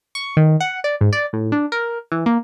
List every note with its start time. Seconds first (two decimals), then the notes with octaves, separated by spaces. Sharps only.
0.15 C#6
0.37 D#3
0.60 F#5
0.84 D5
1.01 G#2
1.13 D5
1.33 A2
1.52 D4
1.72 A#4
2.12 E3
2.26 A#3